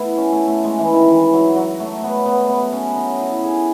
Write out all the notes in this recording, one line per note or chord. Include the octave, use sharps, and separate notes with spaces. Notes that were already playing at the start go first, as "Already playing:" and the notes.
Already playing: A3 B3 E4
C#4
A3
A3
G#3
E3
D#3
E3
F#3
F#3
A3
B3
B3
B3
C#4
D#4
E4
G#4